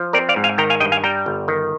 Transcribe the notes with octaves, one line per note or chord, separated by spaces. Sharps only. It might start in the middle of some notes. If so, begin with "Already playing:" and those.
Already playing: F3
C4 A#4 D5
D5 F5
G#2
F5 G#5
D#3 G5 A#5
F5 G#5
G2 D#5 G5
F5 G#5
G3 G5 A#5
G1
D#3